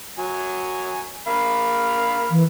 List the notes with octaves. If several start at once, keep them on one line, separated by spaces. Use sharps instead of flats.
F#3 G#5
A#3 F5 B5
E3